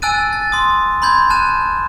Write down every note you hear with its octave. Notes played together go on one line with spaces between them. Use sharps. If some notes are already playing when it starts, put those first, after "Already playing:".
G#5 A5 E6 F#6 A6 D#7
A6
C6 D#6
B5 C6 G6 G#6
A5 F#6 E7